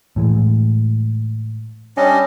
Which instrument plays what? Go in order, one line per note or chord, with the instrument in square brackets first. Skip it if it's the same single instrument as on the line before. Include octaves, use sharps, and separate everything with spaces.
[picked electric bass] A2 E3 G#3
[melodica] G3 D4 D#5 [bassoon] C#4